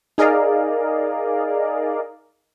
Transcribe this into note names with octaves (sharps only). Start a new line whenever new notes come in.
D#4 G#4 A#4 D5 D#5 F5